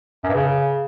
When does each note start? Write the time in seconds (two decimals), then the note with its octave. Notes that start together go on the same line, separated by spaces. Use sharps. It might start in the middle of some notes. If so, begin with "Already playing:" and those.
0.24 F#2
0.29 G2
0.34 C#3